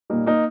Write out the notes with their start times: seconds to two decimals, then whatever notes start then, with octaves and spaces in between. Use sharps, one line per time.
0.10 A#2 G3 A#3 D#4
0.26 A#3 D#4